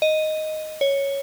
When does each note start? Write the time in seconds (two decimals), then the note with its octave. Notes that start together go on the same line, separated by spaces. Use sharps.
0.02 D#5
0.81 C#5